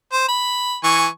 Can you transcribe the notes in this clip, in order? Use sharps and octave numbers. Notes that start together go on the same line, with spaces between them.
C5
B5
E3 G#5 C#6